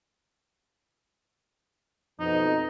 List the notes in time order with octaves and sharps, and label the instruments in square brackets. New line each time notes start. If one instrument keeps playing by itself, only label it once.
[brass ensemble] F2 B2 [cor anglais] D#4